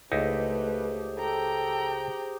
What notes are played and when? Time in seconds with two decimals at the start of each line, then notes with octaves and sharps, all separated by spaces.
0.12 C#2 A3 D#4 E4 G4 G#4 B4 C5
1.19 A4 G5 A#5